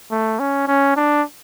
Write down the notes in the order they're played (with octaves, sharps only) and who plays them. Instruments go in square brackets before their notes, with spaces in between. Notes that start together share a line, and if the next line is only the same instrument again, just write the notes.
[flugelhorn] A3
C#4
C#4
D4